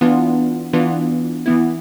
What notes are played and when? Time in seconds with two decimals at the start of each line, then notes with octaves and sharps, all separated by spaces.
0.01 E3 B3 D4 F4
0.73 E3 B3 D4 F4
1.46 E3 B3 E4